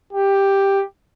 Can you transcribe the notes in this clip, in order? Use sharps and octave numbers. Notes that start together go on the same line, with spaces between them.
G4